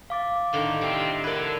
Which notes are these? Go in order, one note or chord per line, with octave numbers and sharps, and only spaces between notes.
F5 D6 A6
A2 D3 D#3
C3 G3 C4
D3 A#4 B4 D5 G#6